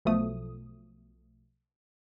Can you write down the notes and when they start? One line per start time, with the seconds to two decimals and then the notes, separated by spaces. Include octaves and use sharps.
0.05 B1 B2 F3 A3 D#6